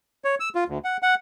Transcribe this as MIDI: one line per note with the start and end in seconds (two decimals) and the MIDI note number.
0.24 0.35 73
0.40 0.49 88
0.55 0.64 65
0.68 0.78 38
0.84 0.97 78
1.03 1.15 78